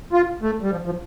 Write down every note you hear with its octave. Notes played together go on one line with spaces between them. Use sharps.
F4
A3
G3
F3
F3